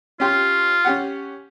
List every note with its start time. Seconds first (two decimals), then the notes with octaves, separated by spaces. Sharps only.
0.20 C#4 F4 G4 C6
0.85 C#4 G4 F#5